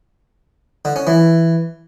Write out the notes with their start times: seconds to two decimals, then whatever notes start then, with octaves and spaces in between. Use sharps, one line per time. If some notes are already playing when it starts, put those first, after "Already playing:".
0.85 D3
0.96 C#4
1.07 E3